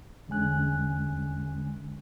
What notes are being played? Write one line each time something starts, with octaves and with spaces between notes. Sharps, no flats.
E2 D3 G#3 C#4 G#5 F#6